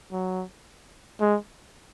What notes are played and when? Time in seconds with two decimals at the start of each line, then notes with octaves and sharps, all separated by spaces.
0.12 F#3
1.20 G#3